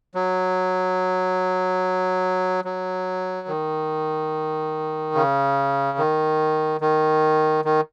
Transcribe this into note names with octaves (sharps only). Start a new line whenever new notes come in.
F#3
F#3
D#3
C#3
D#3
D#3
D#3